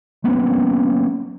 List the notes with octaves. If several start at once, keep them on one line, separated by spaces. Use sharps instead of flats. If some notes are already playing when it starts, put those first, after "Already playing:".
F#3 A#3 B3 C#4